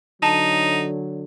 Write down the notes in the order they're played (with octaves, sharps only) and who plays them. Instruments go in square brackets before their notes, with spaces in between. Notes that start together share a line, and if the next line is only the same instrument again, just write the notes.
[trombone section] D3 F#3 [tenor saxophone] D#4 [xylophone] A5 D#7